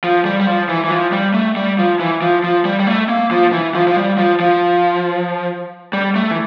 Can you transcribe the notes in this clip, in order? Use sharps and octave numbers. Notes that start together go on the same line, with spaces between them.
F3
G3
G3
F3
E3
E3
F3
G3
A3
G3
F3
E3
F3
F3
G3
G3
A3
A#3
F3
E3
F3
F3
G3
F3
F3
G3
A3
E3